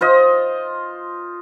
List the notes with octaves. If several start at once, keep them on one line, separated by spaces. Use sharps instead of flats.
F4 C5 D#5